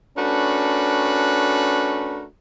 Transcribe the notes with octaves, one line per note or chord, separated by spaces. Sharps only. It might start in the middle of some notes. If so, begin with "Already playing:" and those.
A3 C#4 D4 F#4 A#4 B4